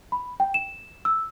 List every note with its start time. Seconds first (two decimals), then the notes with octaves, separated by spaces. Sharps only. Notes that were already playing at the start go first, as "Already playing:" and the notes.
0.12 B5
0.40 G5
0.54 E7
1.05 E6